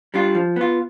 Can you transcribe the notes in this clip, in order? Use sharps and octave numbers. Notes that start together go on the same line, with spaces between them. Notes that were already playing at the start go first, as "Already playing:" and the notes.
G3 D4 F4
F3
B3 F4